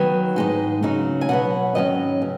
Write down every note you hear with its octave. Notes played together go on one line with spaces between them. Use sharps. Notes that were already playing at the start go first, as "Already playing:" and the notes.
Already playing: D#3 F#3 B3 G#5
G#2 G#3 D#4
C#3 F#3 D#4
G#5
B2 F#3 B3 F#5
G#2 D#3 F#3 C#4 D#5
C#3 B3